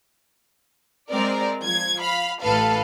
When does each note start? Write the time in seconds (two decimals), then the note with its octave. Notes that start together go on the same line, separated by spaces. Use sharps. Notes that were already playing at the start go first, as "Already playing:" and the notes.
1.10 G#3 C4 A#4 D5
1.62 F3 G#6
2.01 F5 B5
2.42 A1 A2 A4 B4 F5